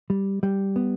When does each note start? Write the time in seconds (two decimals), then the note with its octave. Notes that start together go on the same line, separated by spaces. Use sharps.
0.10 G3
0.43 G3
0.76 B3